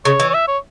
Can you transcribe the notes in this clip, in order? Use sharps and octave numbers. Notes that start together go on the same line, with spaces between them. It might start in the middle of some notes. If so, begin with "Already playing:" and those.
C#3 C#5
E3
C#5
E5
C#5